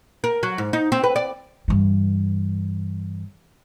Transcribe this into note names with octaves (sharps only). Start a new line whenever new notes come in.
A#4
F#3
G#2
D#4
C4
B4
D5
G2 E3